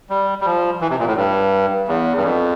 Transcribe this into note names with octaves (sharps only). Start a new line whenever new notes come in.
G3
G3
F3
E3
C3
A#2
A2
G2
E2
G2
F2